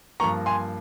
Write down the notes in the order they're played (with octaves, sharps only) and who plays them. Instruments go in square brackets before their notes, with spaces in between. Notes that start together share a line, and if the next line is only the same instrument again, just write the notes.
[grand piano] G2 F3 A#3 A#5 C#6
G#5 C6